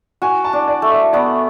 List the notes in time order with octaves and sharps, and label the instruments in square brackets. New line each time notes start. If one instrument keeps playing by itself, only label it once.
[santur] F#4 [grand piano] G#5
[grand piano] A5
[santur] D4
[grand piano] D5
[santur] A3
[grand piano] E5
[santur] B3 [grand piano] D5